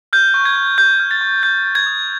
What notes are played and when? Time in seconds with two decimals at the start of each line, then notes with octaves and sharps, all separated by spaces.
0.13 F6 G6
0.34 C#6
0.45 G#6
0.56 C#6
0.78 C#6 G6
1.00 F6
1.11 A6
1.21 C#6
1.43 G6
1.65 G6
1.75 G#6
1.86 D#6